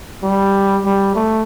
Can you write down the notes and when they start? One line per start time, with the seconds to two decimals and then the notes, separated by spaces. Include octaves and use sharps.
0.23 G3
0.85 G3
1.15 A3